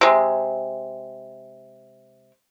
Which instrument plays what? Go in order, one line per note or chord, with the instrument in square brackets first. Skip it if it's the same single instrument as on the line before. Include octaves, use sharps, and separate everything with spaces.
[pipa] C3 G#3